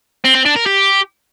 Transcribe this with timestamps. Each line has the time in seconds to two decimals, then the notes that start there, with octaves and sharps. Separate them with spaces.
0.24 C4
0.35 C4
0.45 D4
0.56 A#4
0.66 G4